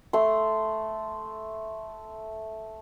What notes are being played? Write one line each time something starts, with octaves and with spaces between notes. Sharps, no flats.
A3 C6